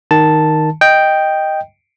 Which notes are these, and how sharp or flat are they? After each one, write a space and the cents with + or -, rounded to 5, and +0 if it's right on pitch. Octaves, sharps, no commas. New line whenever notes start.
D#3 +0 A5 +0
D#5 +0 G5 +0